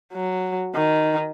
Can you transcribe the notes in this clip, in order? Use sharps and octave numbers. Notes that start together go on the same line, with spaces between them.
F#3
D#3